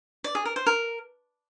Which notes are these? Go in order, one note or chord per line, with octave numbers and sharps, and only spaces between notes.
D5
G#4
A#4
C5
A#4